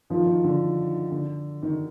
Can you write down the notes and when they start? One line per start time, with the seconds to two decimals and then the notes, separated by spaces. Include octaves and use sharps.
0.10 D#3 F3
0.26 D#3
0.44 D3
1.11 D3
1.63 D#3